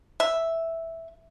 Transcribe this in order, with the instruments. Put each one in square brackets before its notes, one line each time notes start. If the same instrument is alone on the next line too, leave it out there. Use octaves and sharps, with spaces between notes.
[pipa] E5